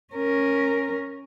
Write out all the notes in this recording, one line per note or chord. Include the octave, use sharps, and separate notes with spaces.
C#4 A#4